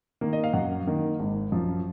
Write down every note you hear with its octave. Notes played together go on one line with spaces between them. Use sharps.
D#3 A#3
D#5
F5
F#2 F#5
D#3 A#3
G#1
F#2 F3